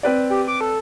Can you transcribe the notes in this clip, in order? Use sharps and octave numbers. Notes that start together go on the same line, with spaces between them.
C4 B4 D5
G4
D6
A4